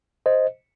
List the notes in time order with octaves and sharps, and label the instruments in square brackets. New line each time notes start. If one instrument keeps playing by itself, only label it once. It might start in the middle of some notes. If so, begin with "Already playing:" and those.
[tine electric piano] C5 D#5